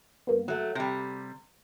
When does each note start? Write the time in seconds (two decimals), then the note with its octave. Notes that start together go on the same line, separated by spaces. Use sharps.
0.27 G2 A#3 B3
0.48 F#3 A3
0.75 C3 G3 G5 A#6